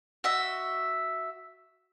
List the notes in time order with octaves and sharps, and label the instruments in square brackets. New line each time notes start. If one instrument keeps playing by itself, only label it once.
[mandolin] F#4 D#5 E5